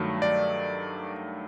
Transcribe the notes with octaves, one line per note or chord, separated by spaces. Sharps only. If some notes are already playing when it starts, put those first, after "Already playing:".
Already playing: G2 D#3 F#3 A3
D5